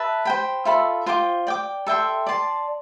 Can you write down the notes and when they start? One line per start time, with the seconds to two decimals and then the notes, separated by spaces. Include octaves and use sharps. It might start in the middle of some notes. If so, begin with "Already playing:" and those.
Already playing: B4 E5 A5
0.25 C5 G5 B5
0.65 F4 A4 E5 B5
1.06 F4 C5 G5 D6
1.47 D5 G5 D6
1.87 A4 E5 G5 C6
2.27 D5 A5 C6